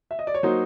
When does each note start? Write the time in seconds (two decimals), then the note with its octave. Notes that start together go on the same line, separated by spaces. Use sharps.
0.11 E5
0.19 D#5
0.27 D5
0.34 C#5
0.43 F#3 A#3 D#4 C5